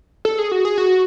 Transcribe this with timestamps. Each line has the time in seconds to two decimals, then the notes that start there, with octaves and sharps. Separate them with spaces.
0.25 A4
0.39 G#4
0.52 F#4
0.65 G#4
0.78 F#4